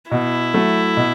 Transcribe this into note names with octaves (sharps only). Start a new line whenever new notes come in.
B2 E4
F#3 A3
B2